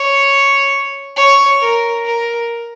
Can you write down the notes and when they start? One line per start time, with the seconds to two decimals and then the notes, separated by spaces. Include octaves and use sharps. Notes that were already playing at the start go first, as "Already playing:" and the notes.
Already playing: C#5
1.16 C#5
1.60 A#4
2.05 A#4